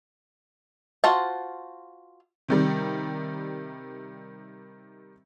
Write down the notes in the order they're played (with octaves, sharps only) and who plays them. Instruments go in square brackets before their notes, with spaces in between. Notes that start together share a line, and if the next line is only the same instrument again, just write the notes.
[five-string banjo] F4 F#4 C5 F#5 A5
[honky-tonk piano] C3 D#3 G3